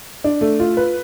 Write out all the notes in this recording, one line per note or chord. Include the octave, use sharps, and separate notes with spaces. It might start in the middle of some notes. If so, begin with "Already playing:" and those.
D4
A3
F4
B4